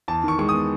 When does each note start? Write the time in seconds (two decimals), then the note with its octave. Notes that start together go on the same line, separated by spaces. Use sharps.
0.08 E2 A5
0.24 D#3 C#6
0.39 G#3 C#6
0.49 D#6
0.54 B3